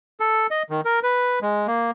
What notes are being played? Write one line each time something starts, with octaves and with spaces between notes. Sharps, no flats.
A4
D#5
D#3
A#4
B4
G#3
A#3